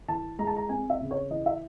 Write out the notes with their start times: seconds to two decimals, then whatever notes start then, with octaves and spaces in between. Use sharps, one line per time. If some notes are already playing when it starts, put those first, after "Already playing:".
0.08 E3 A5
0.39 G#3 A#5
0.47 A5
0.57 A#5
0.69 C4 G#5
0.90 E5
1.01 C#3
1.11 C#5
1.31 E3 D#5
1.46 E5